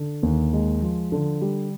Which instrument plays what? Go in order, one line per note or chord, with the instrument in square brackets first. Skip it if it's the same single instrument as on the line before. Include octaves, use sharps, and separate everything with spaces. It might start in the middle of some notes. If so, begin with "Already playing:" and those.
Already playing: [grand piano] D3
D#2
G#3
F3
D3
G3